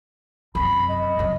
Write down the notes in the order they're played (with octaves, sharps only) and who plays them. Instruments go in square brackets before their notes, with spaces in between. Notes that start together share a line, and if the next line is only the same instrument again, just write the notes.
[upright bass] F#2 C3 [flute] B5
[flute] D#5
[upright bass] C#3 F#3